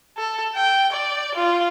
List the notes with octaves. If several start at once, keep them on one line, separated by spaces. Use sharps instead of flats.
A4
G5
D5
F4